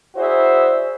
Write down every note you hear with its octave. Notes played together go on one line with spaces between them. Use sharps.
E4 F#4 G#4 C5 D5 E5